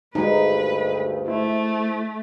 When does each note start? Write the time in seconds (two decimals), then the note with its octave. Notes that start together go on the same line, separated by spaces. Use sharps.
0.15 D2 G2 G#3 D#4 B4
1.28 A3 E4 C5